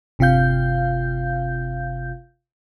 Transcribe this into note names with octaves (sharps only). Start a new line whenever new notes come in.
G1 C3 F4 F5 G6